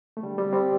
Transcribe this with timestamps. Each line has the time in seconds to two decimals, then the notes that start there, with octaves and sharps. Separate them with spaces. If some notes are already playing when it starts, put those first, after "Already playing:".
0.17 A3
0.23 D3 G3
0.38 G3 C4
0.53 G3 C4